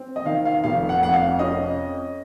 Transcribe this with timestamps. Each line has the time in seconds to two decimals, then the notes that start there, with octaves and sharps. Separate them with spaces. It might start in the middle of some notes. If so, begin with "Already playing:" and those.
Already playing: C4
0.16 D#5
0.25 D#3 F5
0.45 F5
0.63 F1 F5
0.89 F#5
1.01 F2 F#5
1.13 F5
1.39 C#4 D#5